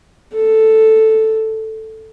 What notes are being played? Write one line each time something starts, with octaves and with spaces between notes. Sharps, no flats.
A4